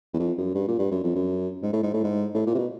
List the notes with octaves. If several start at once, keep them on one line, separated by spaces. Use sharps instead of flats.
E2
F2
F#2
G2
A#2
G2
F#2
F2
F#2
G#2
A2
G#2
A2
G#2
A2
A#2
C3
B2